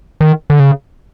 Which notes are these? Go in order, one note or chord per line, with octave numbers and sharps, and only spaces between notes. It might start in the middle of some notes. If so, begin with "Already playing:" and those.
D#3
D3
C#3